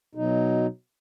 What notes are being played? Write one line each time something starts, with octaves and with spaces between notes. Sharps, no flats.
B2 F#3 D#4